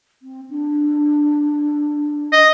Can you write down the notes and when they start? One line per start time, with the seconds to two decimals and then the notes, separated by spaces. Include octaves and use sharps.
0.22 C4
0.50 D4
2.33 D#5